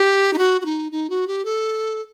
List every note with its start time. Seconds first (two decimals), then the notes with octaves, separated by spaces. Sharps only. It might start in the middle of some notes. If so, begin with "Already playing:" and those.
Already playing: G4
0.33 D#4
0.38 F#4
0.61 F#4
0.65 D#4
0.92 D#4
1.10 F#4
1.28 G4
1.45 A4